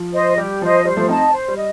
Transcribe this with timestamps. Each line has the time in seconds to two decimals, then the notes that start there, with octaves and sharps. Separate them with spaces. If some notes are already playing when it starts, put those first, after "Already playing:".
Already playing: F3
0.13 C5 D#5
0.37 G3 G4
0.61 F3 C5 D#5
0.85 G3 C5
0.97 F3 A3
1.08 C4 D#4 D#5 A5
1.33 C5
1.48 G3
1.57 D#5